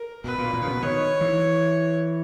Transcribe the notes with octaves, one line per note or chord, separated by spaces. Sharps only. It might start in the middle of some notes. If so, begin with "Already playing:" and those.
Already playing: A#4
B2 B4
A#2
A#2
C#3
B2
D#3 C#5
E3